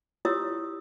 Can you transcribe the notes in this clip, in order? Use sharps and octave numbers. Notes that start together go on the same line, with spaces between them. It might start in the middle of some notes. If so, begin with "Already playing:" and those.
E4 F4 G4 C#5 D#6 E6